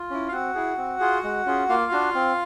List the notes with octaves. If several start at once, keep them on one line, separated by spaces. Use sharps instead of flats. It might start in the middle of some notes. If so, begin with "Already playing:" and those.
Already playing: F4
C#4 E4
F5
C4 F#4 F#5
E4 G#4
C4
F4 G#4
G#3
C#4 F4 G#4
A#3 F4 F5
D4 F#4
C4